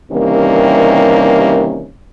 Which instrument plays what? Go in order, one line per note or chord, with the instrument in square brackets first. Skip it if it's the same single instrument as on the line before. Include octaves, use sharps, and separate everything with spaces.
[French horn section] C3 D#3 E3 G3 A#3 C#4